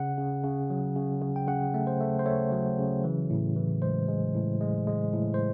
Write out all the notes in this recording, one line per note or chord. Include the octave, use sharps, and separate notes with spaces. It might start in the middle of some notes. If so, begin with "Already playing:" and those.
Already playing: C#3 F#5
C#3
C#3
F#3
C#3
C#3
G5
C#3 F#5
A3
C5
A3
C5
A3 C#5
F#3
C#3
E3
A2
E3
G#3 C5
G#3
A2
G#3
G#3
A2
C5